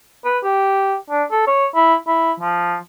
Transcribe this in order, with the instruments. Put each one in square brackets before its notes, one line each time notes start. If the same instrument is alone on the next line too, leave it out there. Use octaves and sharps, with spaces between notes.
[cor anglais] B4
G4
D4
A4
C#5
E4
E4
F3